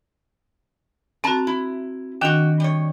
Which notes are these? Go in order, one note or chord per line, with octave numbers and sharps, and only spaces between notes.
C4 F#4 A5 A#5
E4
D#3 D4 F#4 G5
G3 C#5